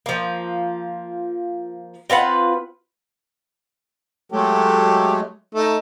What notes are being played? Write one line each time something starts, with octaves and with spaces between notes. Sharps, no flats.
F3 A#3
C4 F4 B4 F#5
F#3 G#3 A3 G4 A4
A3 D#4